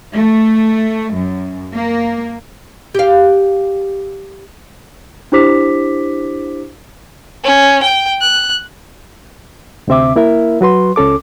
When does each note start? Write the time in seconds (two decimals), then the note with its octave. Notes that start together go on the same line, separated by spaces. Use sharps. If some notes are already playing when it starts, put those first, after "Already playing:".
0.14 A3
1.14 F#2
1.73 A#3
2.95 G4 F5
5.32 D4 E4 G4 C5 D6 B6
7.44 C#4
7.83 G5
8.21 F#6
9.88 D2 C3 C4 E5 D6
10.16 A#3 E4 A#4 E5
10.61 F#3 F#4 B4 C6
10.96 C#2 C#4 A4 D6